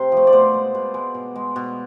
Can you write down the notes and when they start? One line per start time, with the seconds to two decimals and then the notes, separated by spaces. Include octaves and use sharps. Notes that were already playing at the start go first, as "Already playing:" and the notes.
Already playing: C3 C5
0.12 F3 A3
0.27 D5
0.32 B2 C5
0.54 G#3
0.75 B2
0.94 G#3
1.15 B2
1.36 G#3
1.56 B2